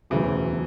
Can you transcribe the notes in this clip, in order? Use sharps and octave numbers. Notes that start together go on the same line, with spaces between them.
E1 D2 C#3 E3 F#3 C#4
B2